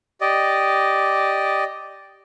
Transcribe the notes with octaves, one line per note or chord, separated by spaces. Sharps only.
G4 D5 D#5